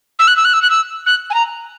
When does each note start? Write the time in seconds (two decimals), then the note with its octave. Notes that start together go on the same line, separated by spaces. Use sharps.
0.19 E6
0.28 F#6
0.37 E6
0.45 F#6
0.53 E6
0.62 F#6
0.70 E6
1.06 F#6
1.30 G#5
1.34 A#5